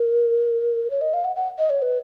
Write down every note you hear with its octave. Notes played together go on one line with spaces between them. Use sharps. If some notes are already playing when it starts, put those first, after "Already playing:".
Already playing: A#4
C#5
D#5
F5
F#5
F#5
D#5
C#5
B4